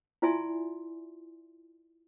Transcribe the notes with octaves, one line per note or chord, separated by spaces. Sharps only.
E4 F4 D5 E5 G#5 C6